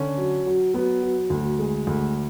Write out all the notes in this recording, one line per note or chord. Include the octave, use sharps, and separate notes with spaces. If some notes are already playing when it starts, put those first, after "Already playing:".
Already playing: D3 C#4
F#3
F#3
F#3 B3
F#3
D2
G#3
D2